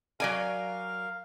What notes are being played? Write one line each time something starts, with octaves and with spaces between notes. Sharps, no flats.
F#3 A#4 D5 F5 G#5